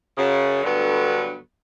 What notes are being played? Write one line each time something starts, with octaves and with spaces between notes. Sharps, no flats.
F#2 C#3
D2 G2 D3 F#3 B3